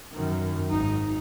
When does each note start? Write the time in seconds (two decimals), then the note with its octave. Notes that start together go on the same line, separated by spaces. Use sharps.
0.12 F#2 D#3
0.70 G#1 D#4